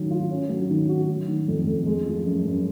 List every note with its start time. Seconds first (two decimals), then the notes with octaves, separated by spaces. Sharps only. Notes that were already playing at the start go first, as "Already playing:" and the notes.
Already playing: D#3 F#3 C#4
0.11 F4
0.31 C#4
0.49 F#3
0.70 D#3
0.89 F#4
1.09 F#3
1.28 D#3
1.48 F2
1.67 F2
1.86 G#3
2.06 F3
2.25 F#2
2.46 F#2